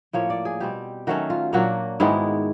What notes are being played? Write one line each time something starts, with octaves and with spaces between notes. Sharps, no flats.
A2 F3 A#3 C#5
D5
G#4
B2 G3 C4 G4
D#3 F#3 A3 C#4 F#4
F4
A#2 F#3 A#3 D4 F#4
G#2 D#3 G#3 B3 E4